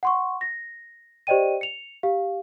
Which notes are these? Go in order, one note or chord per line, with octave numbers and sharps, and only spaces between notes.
F#5 C6 C#6
A#6
G4 C5 D5 D#5 G5 D#7
C#7 F7
G4 F5